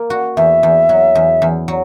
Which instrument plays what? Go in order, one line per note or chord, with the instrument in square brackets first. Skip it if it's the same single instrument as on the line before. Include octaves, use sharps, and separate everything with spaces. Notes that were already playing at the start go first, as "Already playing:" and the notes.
Already playing: [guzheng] A#3
F#4
[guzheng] E2 [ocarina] E5
[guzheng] E2
F#3
E2
E2
F#3